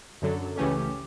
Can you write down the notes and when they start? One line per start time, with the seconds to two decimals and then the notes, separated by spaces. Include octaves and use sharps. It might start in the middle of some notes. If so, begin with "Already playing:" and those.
0.22 F#2 D3 F#3 A4
0.57 C#2 C#3 E3 A3 C#4 G4